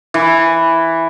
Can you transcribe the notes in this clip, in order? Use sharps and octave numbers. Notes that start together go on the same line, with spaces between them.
E3